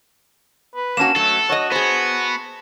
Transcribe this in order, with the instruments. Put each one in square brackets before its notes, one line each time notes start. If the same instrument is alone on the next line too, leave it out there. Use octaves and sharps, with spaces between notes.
[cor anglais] B4
[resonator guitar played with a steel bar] A#3 C#4 F#4 [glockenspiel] A5 E7
[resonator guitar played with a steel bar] F#3 [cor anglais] A3 [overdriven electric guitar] A4
[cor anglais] F#4 [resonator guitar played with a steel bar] C#5 D#5
[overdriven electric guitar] B3 [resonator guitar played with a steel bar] G#4 C5